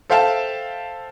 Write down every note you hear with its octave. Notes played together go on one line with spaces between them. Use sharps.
A4 C5 E5 F5 G5 A5